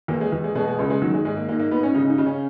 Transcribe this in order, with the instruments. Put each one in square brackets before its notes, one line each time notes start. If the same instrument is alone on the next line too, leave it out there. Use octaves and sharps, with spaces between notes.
[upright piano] E2 A#3
G#3
E2
G#3
B2 G#3
G#3
C#2 G#3
G#3
D#3 F#3
G#3
G#2 G#3
A#3
G#2 A#3
A#3
G#2 B3
C#4
C#3 D#4
D#4
C#3
C#4